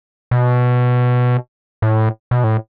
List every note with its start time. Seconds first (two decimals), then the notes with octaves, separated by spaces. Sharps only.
0.31 B2
1.82 A2
2.31 B2
2.44 A2